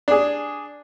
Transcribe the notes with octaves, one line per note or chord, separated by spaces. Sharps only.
D4 G#4